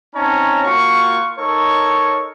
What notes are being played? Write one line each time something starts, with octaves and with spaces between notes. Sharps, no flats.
C4 C#4 D#4 C#5 A5 A#5
A#3 F4 F#4 C#6
D#4 A4 A#4 C#5 C#6